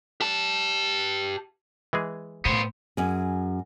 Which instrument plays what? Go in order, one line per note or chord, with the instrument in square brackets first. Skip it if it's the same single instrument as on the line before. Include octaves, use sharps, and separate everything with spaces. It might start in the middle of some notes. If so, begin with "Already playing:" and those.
[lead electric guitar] G4 A5
[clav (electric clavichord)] E3 G#3 G#4
[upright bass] A2 [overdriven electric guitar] B3 C5
[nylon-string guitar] F#2 G#4